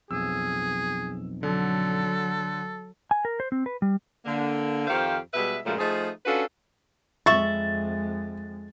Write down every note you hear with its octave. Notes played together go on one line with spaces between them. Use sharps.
B1 F2 G#4 E6
D3 F#3 A4
G#5
A#4
C5
C4
B4
G3
D3 A#3
F2 D#3 G4 C5 F5
B2 G3 G#3 B4 E5
F#2 A#2 F3 F#3 G#3 A3
F3 A3 D#4 G#4
C#4 D4 F4 F#4 A4 B4
F2 G#3 E5 B5 C#6 A6